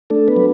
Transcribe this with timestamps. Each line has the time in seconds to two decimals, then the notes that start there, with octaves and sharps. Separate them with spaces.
0.10 A3 D4 A4
0.28 B3 B4
0.37 F#3